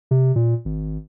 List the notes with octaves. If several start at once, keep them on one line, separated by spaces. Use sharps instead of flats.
C3
A#2
G#1